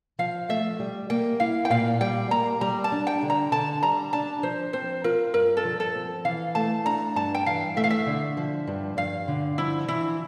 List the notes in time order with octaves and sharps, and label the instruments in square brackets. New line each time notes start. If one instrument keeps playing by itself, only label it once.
[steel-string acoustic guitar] F3 [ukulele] F5
[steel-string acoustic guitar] A3 [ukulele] E5
[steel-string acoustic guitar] G3
[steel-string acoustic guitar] A#3 [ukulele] G5
[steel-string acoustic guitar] E4 [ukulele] F5
[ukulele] G5
[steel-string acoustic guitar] A#2 [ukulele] F5
[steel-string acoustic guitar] G3 [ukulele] G5
[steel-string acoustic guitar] A#3 [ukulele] A#5
[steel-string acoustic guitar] G3 [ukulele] A#5
[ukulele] A5
[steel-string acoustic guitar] D4
[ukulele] G5
[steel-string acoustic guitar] D3
[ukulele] A#5
[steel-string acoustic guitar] D3 [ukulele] A5
[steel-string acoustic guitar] G3 [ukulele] A#5
[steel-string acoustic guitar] D4 [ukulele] A5
[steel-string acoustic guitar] F3 [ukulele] C5
[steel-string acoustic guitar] C4 [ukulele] C5
[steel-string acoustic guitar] F4 [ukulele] A#4
[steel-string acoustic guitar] G2 [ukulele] A#4
[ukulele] A4
[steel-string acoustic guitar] F3
[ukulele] A4
[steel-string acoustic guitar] C4
[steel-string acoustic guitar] E3 [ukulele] F5
[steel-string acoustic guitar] A3 [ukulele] A5
[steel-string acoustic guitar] D4 [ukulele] A#5
[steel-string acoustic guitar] G2 [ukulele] A5
[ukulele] G5
[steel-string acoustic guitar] E3 [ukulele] F5
[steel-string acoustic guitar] A3 [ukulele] E5
[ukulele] F5
E5
[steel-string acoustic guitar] D3
F3
G2
[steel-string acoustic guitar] G2 [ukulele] F5
[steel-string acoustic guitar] D3
[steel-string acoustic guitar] F3 [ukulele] E4
[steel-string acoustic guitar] E3 [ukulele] E4